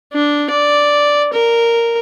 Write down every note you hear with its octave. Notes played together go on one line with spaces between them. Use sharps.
D4
D5
A#4